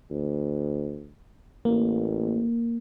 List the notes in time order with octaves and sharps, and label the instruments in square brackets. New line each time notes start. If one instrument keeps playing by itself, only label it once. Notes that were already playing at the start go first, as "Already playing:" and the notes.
[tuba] D2
[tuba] A1 [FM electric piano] A#3